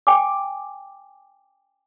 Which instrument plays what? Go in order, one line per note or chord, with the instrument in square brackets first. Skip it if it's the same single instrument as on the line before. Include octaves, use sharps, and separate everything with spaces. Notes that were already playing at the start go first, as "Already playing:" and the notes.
[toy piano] G5 G#5 D6